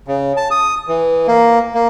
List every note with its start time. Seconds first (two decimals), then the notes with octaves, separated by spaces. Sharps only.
0.08 C#3
0.37 A5
0.51 D#6
0.88 E3
1.28 A#3
1.75 A#3